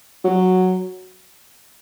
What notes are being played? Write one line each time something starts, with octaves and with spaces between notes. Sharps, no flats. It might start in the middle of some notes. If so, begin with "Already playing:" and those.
F#3